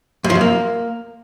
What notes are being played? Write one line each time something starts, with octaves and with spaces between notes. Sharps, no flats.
F#2
F3
F#2
A#3